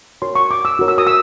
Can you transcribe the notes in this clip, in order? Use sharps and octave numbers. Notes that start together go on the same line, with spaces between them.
F#4 A#4 C#5 C6
C#6
D6
E6
F#4 A#4 C#5
E6
D#6
E6